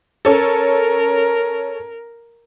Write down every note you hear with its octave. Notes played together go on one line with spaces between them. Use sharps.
C#4 A4 A#4